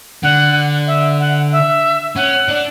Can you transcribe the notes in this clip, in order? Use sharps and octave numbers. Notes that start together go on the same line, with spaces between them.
D3 F#5
E5
F#5
E5
C#4 F#5
D4